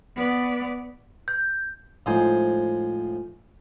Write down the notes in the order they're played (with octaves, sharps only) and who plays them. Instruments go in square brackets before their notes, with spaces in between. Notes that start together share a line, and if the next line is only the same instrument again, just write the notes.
[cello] B3 D5
[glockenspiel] G6
[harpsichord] A2 F3 G#3 D#4 C5 G#5